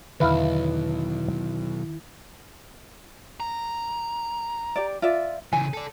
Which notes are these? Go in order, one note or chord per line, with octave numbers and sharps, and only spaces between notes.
B1 E2 D3 D#3 E4 B4 E5 F5
A#5
G4 D5
F4 D5 E5
C#3 E3 G#5
A4 D5